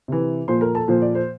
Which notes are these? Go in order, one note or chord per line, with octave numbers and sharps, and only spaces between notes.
C3 E3
A#2 F3 C5 C6
A#4 A#5
A4 A5
A#2 F3 C5
D5
C5